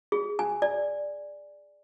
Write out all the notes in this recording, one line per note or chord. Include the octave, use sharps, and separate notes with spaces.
G#4
G#5
D5